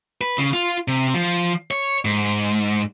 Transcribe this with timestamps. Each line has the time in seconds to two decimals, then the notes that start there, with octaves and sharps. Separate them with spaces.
0.21 B4
0.38 C#3
0.53 F4
0.88 C3
1.14 F3
1.71 C#5
2.05 G#2